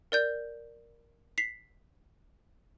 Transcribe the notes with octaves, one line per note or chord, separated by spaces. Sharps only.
A#4 D5 G6
B6 C7 F7